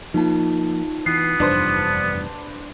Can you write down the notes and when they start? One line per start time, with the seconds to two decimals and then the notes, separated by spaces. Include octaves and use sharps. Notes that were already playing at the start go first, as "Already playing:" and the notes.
0.14 F3 A#3 D#4 F4 A5
1.06 E3 B3 C7
1.40 F1 E2 G2 D4 B4 C5